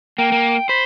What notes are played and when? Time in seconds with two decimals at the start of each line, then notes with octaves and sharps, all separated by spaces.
0.18 A#3 G5
0.32 A#3
0.69 C5 B5